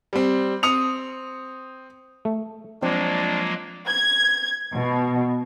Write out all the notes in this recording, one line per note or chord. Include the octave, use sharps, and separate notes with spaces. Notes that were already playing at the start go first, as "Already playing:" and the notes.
G3 C4
C4 D#6 C#7 F7
A3
F3 F#3 G#3 A#3 C4 D4
G#6
B2